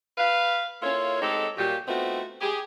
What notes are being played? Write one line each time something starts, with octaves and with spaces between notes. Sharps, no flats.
B4 F5
A#3 E4 F4 A4 C#5
G#3 C4 D#4 G4 A4
A#2 F#3 G4
A3 B3 C4 D#4 F4 F#4
G4 G#4